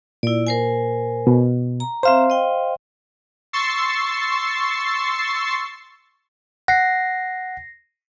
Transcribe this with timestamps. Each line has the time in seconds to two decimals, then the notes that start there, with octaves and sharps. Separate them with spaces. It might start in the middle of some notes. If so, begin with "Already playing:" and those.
0.23 A#2 E4 D5
0.47 A#4 C5 G#5
1.27 B2
1.80 A#5
2.03 C4 C5 E5 F5 A#5 C6
2.30 D#5 G5
3.53 C6 C#6 E6 A6 C7
6.68 F#5 A#6 C7